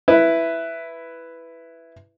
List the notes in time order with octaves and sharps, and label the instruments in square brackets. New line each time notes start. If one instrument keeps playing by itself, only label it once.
[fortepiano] E4 B4